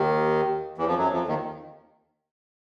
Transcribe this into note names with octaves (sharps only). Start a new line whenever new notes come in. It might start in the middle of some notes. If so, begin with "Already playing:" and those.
Already playing: D#2 D#3
E2 E3
F2 F3
F#2 F#3
F2 F3
D#2 D#3